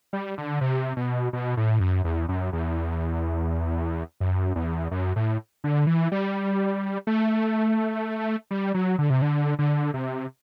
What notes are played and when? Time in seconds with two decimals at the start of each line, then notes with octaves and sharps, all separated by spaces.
0.13 G3
0.38 D3
0.61 C3
0.97 B2
1.33 B2
1.57 A2
1.80 F#2
2.04 E2
2.29 F#2
2.53 E2
4.20 F#2
4.56 E2
4.91 F#2
5.16 A2
5.64 D3
5.87 E3
6.12 G3
7.07 A3
8.51 G3
8.74 F#3
8.98 D3
9.10 C3
9.22 D3
9.59 D3
9.94 C3